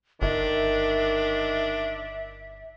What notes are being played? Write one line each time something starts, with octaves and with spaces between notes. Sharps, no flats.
G1 D#3 D4 E5